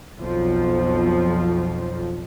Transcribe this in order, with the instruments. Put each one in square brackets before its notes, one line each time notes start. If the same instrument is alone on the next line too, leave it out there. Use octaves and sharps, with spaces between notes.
[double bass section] B1 F2 F3